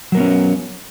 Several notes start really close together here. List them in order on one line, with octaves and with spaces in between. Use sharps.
F#3 A#4 B3 C#4